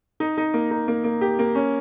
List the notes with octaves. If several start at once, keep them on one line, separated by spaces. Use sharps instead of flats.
D#4
D#4
A#3
D#4
A#3
A#3
G4
A#3
C#4